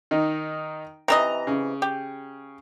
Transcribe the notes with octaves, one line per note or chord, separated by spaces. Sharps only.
D#3 D#4
C3 E3 D#5 A#5
C#3
G4